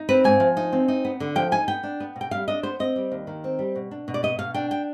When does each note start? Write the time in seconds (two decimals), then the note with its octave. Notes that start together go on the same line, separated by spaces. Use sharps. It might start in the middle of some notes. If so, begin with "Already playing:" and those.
Already playing: D#4
0.09 C4 B4
0.24 G#2 G#5
0.40 F3
0.57 D#4
0.73 C4
0.88 D#4
1.05 B3
1.20 D3
1.36 F3 G5
1.52 D#4 G#5
1.68 B3 G5
1.83 D4
2.00 B3
2.16 B2
2.21 G5
2.31 G3 F5
2.48 D4 D#5
2.63 B3 C5
2.80 C4 D#5
2.96 G3
3.12 D#2
3.27 D#3
3.44 C4
3.59 G3
3.75 B2
3.91 D4
4.08 B2
4.14 D5
4.23 B3 D#5
4.39 B2 F5
4.54 D4 G5
4.71 G5